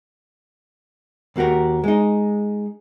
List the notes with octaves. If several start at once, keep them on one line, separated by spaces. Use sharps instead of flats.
D#2 A#3 F#4 G4 A#4
G#3 D#4